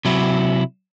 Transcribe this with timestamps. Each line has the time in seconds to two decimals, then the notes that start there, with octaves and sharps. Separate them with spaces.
0.05 C3 F#3 E4